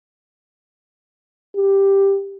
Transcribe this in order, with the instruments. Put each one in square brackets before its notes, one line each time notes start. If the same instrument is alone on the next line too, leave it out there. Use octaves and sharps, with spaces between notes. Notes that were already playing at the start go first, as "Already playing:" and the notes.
[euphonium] G4